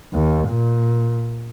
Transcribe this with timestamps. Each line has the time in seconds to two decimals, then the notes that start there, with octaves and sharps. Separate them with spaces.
0.13 D#2
0.49 A#2